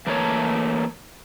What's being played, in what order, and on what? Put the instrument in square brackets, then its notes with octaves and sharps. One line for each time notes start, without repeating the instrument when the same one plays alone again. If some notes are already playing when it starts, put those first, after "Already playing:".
[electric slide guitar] E3 A3 A#3 A4 C#5 A5